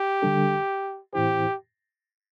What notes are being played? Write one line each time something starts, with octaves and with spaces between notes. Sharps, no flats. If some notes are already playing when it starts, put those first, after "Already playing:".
Already playing: G4
D3 G3 D4 A4
A2 E3 C4 E4 G4 C5